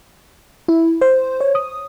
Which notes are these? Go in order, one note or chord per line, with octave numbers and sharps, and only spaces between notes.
E4
C5
C#5
D#6